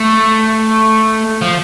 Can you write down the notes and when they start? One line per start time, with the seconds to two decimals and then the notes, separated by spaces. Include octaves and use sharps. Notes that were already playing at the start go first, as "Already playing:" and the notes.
Already playing: A3
1.42 F3